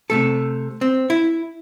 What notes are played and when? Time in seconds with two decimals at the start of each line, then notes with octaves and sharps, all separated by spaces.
0.10 C3 A3 A4
0.81 C4
1.10 E4